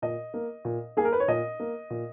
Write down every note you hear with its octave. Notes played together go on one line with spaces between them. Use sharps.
A#2 D#5
A#3
A#2
A#3 G#4
A#4
B4
C#5
A#2 D#5
A#3
A#2